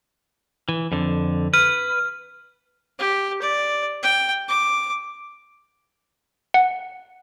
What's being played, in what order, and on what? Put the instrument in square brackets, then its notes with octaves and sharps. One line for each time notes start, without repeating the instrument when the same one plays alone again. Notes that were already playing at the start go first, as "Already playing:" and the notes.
[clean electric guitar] E3
F2 D3
[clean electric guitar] B4 [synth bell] F6
[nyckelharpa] G4
D5
G5
D6
[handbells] F#5